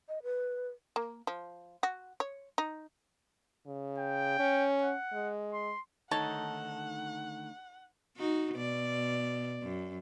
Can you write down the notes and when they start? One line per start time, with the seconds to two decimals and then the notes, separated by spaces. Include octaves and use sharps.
0.09 D#5
0.23 B4
0.96 A#3
1.27 F3
1.83 F#4
2.20 C#5
2.58 D#4
3.66 C#3
3.98 G5
4.39 C#4
4.82 F#5
5.13 G#3
5.53 C6
6.11 D2 D#3 D#4 A4 C#5 F#5 A5
8.17 D#4 F#4
8.55 B2 D5
9.63 F#2